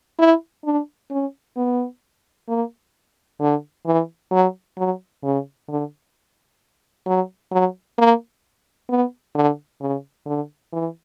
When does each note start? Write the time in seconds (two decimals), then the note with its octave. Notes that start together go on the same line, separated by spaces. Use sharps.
0.19 E4
0.65 D4
1.11 C#4
1.57 B3
2.49 A#3
3.40 D3
3.86 E3
4.31 F#3
4.77 F#3
5.24 C#3
5.68 D3
7.06 F#3
7.51 F#3
7.98 A#3
8.89 B3
9.35 D3
9.81 C#3
10.26 D3
10.73 E3